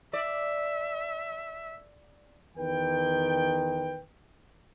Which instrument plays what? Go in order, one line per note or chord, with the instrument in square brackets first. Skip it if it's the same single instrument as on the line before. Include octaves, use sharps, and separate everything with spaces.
[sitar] D5 [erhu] E5
[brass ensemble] E2 D#3 B4 G5